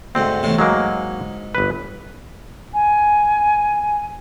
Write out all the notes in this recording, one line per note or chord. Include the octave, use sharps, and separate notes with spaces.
D2 G#2 C4
E2 A2 C3
G#2 F#3 G#3 A#3
G1 B4
G#5